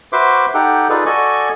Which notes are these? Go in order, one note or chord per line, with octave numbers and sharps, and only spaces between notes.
F#4 B4 C5 E5 C6 D6
D#4 G4 A4 F#5 G5
D#4 F4 G#4 A4 B4 D5
F#4 A4 D5 D#5 G#5 C#6